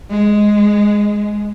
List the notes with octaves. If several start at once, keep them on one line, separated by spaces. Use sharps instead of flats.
G#3